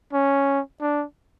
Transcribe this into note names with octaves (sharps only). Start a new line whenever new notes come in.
C#4
D4